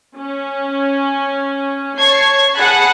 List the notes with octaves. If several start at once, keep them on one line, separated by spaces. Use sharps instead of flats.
C#4
C#5 A5 C#6 G#6 C7
G#4 F#5 A5 B5 F#6